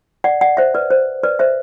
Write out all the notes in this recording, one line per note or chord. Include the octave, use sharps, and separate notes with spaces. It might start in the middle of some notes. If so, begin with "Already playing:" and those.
D5 F#5
D5 F#5
C5 E5
B4 D5
C5
B4 D5
C5 E5